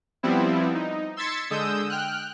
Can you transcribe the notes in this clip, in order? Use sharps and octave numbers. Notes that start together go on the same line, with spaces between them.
F3 G3 B3 C4 E4
D#4
C6 E6 G#6 A6 B6 C#7
D3 G#3 D#6 E6 G6
G5 F6 F#6